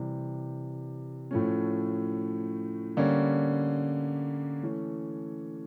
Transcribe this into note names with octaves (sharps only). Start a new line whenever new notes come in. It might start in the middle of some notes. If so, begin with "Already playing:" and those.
Already playing: C3 E3 G3
A2 F3 A3 C#4
D3 G3 A#3 C#4
E3 A3 C#4